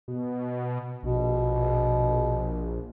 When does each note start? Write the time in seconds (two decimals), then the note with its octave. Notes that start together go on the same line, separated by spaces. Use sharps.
0.08 B2
1.03 A#1 B2